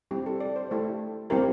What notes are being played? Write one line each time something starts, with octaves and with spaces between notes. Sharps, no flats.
G3 C4 E4 G4
A4
D5
C5
A3 E4 G4 A4
G3 C4 E4 G4 A#4